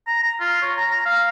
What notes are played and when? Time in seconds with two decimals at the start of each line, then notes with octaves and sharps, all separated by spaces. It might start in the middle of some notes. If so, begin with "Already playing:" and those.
0.07 A#5
0.23 A#5
0.40 F4
0.62 C#5
0.77 A#5
1.06 F5